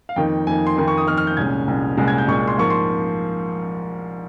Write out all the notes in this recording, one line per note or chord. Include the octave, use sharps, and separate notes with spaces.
F5
F2 D#3 A#3 D#4 G5
F2 D#3 A#3 D#4 G#5
C6
F2 D#3 A#3 D#4 C6
C#6
D#6
F2 D#3 A#3 D#4 F6
F6
G6
C2 A#2 G#3 C#4 G#6
C2 A#2 G#3 C#4
C2 A#2 G#3 C#4
G#6
G6
C2 A#2 G#3 C#4 C#6
C6
G#2 F3 A#3 C#6
C6